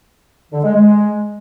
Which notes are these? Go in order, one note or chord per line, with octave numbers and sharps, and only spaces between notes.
D3
G#3
G#3